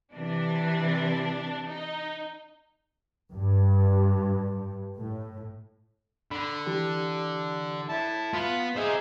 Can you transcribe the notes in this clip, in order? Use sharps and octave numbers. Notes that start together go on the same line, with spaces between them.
C3 E3 D4
D#4
G2
A2
D3 B5
E3 G4
E4 A5
B3 F4 F5 B5
D#4 G#4 C5 E5